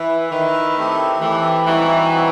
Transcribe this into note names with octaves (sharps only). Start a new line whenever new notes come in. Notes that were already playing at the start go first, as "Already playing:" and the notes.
Already playing: E3 E4 B4 E5
D#3 E4 B4 E5
A3 C4 E4 G4
E3 A3 C4 E4 G4
E3 G3 C4 D#4 F#4
G3 C4 D#4 F#4